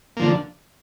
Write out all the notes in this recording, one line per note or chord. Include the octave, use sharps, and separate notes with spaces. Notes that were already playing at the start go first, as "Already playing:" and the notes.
D3 F3 A#3